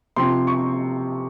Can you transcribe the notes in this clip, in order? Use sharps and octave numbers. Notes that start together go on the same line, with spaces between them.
C3 F3 C4 C6
C#6